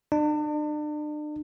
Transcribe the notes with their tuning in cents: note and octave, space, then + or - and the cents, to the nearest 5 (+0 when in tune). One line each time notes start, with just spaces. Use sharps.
D4 +40